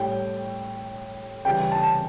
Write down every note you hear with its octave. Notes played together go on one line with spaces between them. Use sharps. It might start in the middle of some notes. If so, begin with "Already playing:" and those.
Already playing: A2 G3 G5
C#3 E3 G3 G5
A5